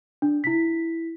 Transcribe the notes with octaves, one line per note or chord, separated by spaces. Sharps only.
D4
E4 B6